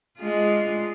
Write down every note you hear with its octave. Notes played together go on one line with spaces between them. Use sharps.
G#3 D4 F4